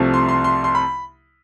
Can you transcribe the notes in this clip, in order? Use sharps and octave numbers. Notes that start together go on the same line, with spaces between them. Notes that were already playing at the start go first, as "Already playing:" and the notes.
Already playing: C2 C3 F3 A3
C6
C6
C6
C6
B5